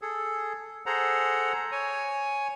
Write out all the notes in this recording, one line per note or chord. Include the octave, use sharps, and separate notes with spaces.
G#4 A4
G#4 A4 C5 F#5 A#5
C#5 G#5